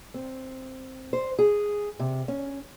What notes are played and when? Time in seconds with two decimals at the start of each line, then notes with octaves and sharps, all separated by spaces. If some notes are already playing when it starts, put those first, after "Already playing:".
0.14 C4
1.13 C5
1.39 G#4
1.99 C3
2.28 C#4